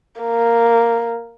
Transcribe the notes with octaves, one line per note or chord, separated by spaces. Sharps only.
A#3